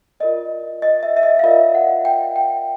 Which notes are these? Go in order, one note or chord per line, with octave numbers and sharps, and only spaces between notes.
F4 A#4 D5 D#5
D#5
E5
E5
D#5
F5
F4 A#4 D5 E5
F#5
G5
G5